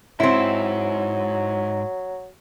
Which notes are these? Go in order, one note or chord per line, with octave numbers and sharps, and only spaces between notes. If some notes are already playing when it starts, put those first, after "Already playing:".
G#2 F#3 C4 E4